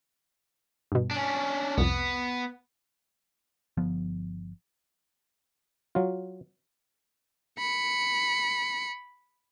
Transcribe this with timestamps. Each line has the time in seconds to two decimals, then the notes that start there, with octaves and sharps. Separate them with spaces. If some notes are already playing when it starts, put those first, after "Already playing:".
0.92 G2 B2
1.11 C#4 D4
1.78 C2 F2 B3
3.77 G1 F3 B3
5.95 F#3 F4
7.59 B5 C#7